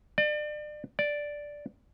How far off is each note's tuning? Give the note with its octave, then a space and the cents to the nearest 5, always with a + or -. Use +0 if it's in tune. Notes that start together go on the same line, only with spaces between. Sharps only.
D5 +35
D5 +0